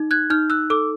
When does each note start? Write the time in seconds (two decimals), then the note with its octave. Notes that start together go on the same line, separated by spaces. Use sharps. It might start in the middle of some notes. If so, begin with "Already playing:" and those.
Already playing: D#4
0.11 F#6 G#6
0.30 D#4 F6 G6
0.50 E6 F#6
0.70 A4 D6 E6